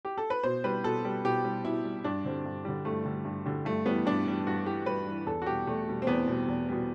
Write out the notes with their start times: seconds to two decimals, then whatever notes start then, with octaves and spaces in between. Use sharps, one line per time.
0.05 G4
0.18 A4
0.30 B4
0.43 B2 C5
0.64 G3 B4
0.84 B2 A4
1.05 G3
1.24 B2 G4
1.45 G3
1.64 B2 E4
1.85 G3
2.04 G2 D4
2.25 D3 G3 C4
2.46 G2
2.65 D3 G3
2.85 G2 A3
3.05 D3 G3
3.25 G2
3.46 D3 G3
3.65 G2 A3
3.86 E3 G3 B3
4.06 G2 D4
4.26 E3 G3
4.47 G2 F#4
4.66 E3 G3 G4
4.86 G2 B4
5.07 E3 G3
5.27 E2 A4
5.42 F#4
5.46 B2 G3 G4
5.67 E2 A3
5.88 B2 G3
6.02 C4
6.07 E2 B3
6.27 B2 G3
6.48 E2
6.68 B2 G3